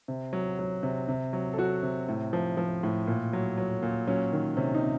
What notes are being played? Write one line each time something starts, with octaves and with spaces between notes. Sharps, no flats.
C3
F#3
F#3
C3
C3
F#3
A4
F#3 F#4
C3
A2
F3
F3
A2
A#2
F#3
F#3
A#2
F#3 C#4
D#3
C3 C#4
D#4
C3